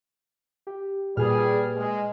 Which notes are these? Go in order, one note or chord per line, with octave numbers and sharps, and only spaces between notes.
G4
A#2 G3 G#4 B4 F6
G#3